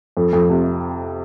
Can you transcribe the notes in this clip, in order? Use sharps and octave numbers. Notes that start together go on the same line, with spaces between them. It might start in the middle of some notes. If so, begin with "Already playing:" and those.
F2
F2
C3